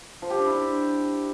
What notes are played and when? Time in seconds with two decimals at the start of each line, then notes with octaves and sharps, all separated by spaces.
0.22 F3
0.30 G4
0.38 D4
0.46 E4
0.54 D4